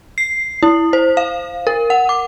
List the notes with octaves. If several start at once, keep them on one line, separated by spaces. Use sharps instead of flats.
C7
E4
C5
F5
A#4
F#5
D6